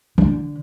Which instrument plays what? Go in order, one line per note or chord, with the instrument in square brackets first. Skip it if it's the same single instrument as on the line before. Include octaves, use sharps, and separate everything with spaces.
[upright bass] D3